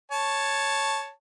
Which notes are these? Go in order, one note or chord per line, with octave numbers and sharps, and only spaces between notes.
C#5 A5